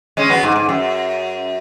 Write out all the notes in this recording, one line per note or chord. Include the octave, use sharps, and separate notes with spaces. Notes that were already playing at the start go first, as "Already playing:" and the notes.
G#3 C#4
F#3 B3
G#2
G#2
F#2